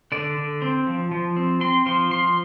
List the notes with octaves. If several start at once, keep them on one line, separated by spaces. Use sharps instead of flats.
D3 D5
D3
C4
F3
F3
C4
C4 C6
F3 C6
F3 C6